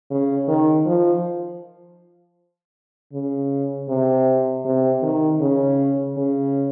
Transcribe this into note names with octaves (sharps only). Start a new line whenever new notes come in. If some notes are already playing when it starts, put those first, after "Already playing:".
C#3
D#3
F3
C#3
C3
C3
D#3
C#3
C#3